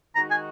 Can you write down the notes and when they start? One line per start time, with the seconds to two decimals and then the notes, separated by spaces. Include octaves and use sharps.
0.16 D#3 G#3 D#4 F#4 A#5
0.31 G#5